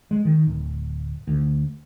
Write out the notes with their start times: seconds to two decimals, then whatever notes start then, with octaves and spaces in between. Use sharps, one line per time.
0.11 G#3
0.25 D#3
0.47 D1
1.28 D2